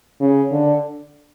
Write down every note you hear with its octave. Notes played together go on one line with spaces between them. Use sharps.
C#3
D3